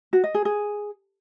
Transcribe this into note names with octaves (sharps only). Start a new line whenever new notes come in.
F#4
D#5
G#4
G#4